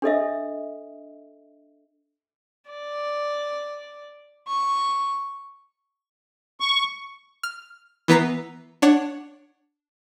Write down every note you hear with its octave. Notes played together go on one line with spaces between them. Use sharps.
D4 A4 D#5 E5
D5
C#6
C#6
F6
E3 B3 B4 A#5 C7
D4 C#5 F#5 D6